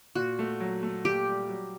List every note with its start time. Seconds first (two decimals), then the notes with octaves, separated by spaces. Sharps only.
0.15 A#2 F#4
0.39 A3
0.60 F#3
0.83 A3
1.05 A#2 G4
1.27 G3
1.49 F#3